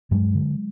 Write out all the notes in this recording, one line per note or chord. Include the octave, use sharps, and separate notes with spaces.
G2 F#3 G#3
D3